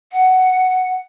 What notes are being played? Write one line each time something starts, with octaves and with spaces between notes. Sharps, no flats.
F#5